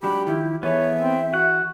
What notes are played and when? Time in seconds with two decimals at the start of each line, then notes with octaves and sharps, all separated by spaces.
0.03 G#2 F#3 D4 G4 B5
0.27 D#3 F3 E4
0.63 E3 B3 G#4 A4 C#5 E5
1.00 C4
1.34 F#4 F#5